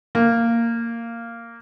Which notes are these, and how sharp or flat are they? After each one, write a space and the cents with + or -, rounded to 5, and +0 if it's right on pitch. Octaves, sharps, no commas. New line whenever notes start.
A#3 -10